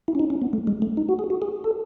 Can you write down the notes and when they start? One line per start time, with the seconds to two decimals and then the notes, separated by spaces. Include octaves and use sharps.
0.08 E4
0.15 C#4
0.19 D#4
0.30 C#4
0.42 B3
0.53 A3
0.67 G#3
0.82 A3
0.97 D#4
1.09 F#4
1.19 G#4
1.30 F#4
1.42 G#4
1.64 A4